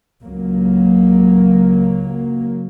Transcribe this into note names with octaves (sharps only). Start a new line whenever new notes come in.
C#2 F#3 A#3